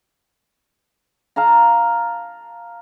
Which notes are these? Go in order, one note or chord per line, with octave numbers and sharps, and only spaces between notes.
F5 A5 A#5